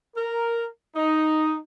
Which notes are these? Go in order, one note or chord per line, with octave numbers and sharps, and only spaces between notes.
A#4
D#4